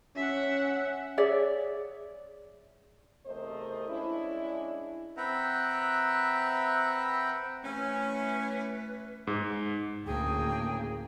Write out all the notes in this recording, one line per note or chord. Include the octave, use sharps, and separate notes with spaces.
C#4 E5 F#5
G#4 C#5 D5 E5
E2 C3 A3 A#4 C5 D#5
G#3 C#4 D4 E4
C4 B4 E5 F#5 G5 A#5
E3 A3 C#4 B4
G#2
D2 A2 C#3 A#3 G#4 G5